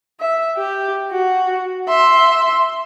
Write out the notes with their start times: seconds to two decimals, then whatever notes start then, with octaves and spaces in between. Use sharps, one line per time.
0.20 E5
0.57 G4
1.11 F#4
1.88 E5 C6